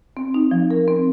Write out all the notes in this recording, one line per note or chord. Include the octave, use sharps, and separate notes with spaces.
C4
D#4
F3
A#4
C4